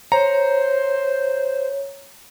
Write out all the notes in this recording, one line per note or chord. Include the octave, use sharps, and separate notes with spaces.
C5 C#5 A#5